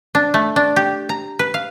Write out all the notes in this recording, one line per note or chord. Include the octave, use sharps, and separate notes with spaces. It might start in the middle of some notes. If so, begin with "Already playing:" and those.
D4
A3
D4
G4
A#5
B4
F5